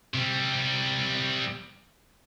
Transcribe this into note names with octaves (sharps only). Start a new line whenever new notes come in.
C3 G3